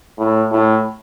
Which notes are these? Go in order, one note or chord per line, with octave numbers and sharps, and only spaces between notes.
A2
A2